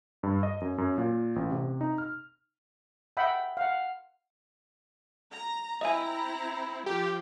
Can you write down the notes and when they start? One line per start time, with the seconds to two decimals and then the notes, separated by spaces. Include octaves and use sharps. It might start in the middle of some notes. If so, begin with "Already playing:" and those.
0.23 G2
0.43 D#5
0.61 F#2
0.78 F#2
0.98 A#2
1.36 A1
1.51 C3
1.81 D#4
1.98 F6
3.17 D#5 E5 F#5 G5 B5
3.57 F5 F#5
5.30 A#5
5.81 C4 E4 D#5 E5 G#5 A#5
6.86 F3 F4 G4